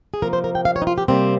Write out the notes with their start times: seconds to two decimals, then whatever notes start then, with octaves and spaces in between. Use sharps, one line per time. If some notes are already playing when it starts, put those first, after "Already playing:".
0.14 G#4
0.22 C3 F3 A#3 A#4
0.33 C5
0.44 A#4
0.55 G5
0.65 F5
0.76 C#5
0.82 D#4
0.87 F4
0.98 G4
1.08 C3 G3 A#3 C4